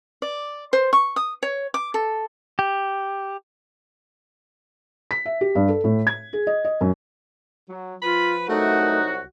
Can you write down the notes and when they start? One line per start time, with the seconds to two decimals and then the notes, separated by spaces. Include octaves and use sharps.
0.22 D5
0.73 C5
0.93 C#6
1.16 D#6
1.43 C#5
1.74 D6
1.94 A4
2.59 G4
5.11 B6
5.26 E5
5.41 G4
5.55 G2
5.68 A4
5.84 A2
6.07 G#6
6.33 G#4
6.47 D#5
6.65 D#5
6.81 F#2
7.68 F#3
8.03 F3 F4 B4 B5
8.49 C2 F#3 A3 D#4 F#4 A#4